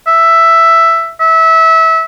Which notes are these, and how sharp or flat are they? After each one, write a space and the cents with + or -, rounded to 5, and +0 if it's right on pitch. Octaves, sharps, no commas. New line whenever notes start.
E5 +5
E5 -20